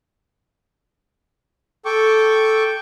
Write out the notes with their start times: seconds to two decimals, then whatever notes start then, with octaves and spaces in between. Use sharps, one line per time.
1.85 A4 G5 C#6 D6